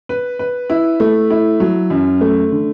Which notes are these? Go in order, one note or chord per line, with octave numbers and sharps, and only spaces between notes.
B4
B4
E4
A3
E4
F#3
F#2
A3
D3